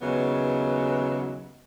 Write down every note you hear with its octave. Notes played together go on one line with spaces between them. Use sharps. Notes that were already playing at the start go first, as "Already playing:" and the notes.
D#2 C#3 E3 F#3 G#3 B3